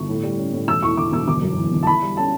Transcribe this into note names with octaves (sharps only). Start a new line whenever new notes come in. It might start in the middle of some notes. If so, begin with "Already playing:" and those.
Already playing: G1 C#6
A2
G3
C#4
A2
E1 E6
E2 C#6
D3 D6
E1 E6
G1 D6
F#2
E3
G1
A5
E4 B5
G3
C#4 A5